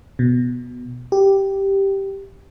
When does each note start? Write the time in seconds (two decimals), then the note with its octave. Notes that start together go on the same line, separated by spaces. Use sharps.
0.19 B2
1.12 G4